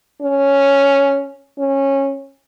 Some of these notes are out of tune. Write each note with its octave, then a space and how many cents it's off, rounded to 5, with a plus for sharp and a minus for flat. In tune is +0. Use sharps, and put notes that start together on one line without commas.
C#4 +0
C#4 -15